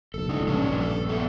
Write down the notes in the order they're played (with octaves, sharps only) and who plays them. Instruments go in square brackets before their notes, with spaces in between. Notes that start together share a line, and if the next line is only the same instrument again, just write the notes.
[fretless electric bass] F#1 B1 [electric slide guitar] A4
[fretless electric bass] C#2 D3 [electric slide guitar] C#4 D#4
[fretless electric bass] A#1 G2 [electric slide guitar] F#3 C#4 D4
[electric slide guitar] A4
A3 B3 D5